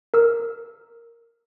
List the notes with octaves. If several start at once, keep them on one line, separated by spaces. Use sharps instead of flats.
A#4 E6